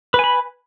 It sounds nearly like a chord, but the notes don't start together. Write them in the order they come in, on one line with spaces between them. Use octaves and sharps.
B4 G#5 B5